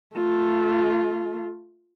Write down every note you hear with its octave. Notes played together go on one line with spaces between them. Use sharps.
A3 F4